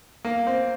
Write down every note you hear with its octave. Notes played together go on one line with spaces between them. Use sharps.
A#3
C4